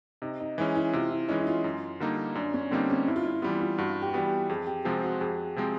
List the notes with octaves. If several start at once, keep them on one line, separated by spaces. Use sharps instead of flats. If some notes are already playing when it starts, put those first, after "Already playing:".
C3 D#4
D#4
E3 G#3 C#4 E4
E4
C3 F4
E4
E3 G#3 C#4 D#4
E4
F4
F#2
D3 G3 A#3 D#4
F#2 D4
C#4
D3 G3 A#3 C4 D#4
C#4
G2 E4
F4
E4
E3 G3 B3 F4
F4
G2 F#4
G4
F#4
E3 G3 B3 G4
G4
F2 G#4
G4
C3 F3 G#3 C4 F#4
F#4
F2 G#4
C3 F3 G#3 C4